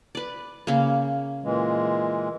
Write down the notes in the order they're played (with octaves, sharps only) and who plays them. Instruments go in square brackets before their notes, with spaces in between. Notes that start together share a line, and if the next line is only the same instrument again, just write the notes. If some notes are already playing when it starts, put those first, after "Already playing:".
[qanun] B4 D5
C#3 A#3
[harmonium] A#2 E3 G#3